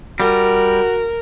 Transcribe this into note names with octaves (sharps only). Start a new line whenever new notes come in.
G3 F#4 A#4